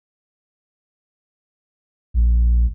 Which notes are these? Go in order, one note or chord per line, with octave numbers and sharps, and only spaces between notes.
A#1